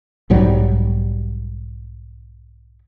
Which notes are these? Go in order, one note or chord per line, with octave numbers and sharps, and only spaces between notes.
B1 G#2 F#3 G3